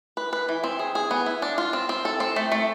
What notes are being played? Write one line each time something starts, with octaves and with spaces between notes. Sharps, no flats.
B4
B4
E3
C4
G#4
G#4
B3
E4
D4
F4
C4
C4
A4
C4
A3
A3